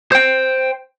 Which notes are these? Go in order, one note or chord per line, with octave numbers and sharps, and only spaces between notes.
C5 G5